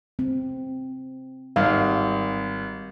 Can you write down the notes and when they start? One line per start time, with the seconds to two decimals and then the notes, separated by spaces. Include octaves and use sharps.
0.19 C4
1.56 G#1 G3 F5